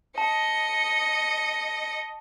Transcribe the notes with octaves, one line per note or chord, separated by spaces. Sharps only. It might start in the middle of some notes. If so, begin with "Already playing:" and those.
D#5 A5 C#7